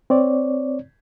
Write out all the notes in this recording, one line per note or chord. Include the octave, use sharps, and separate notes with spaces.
C4 C#5 D5